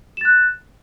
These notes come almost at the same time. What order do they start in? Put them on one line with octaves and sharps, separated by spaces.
E7 A6 F#6